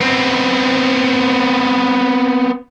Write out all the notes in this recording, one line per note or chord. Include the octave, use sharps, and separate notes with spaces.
B3 C4